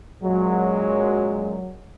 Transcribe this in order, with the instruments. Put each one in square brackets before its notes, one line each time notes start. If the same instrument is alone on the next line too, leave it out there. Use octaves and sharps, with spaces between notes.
[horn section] F#2 A#2 G#3 [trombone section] F#3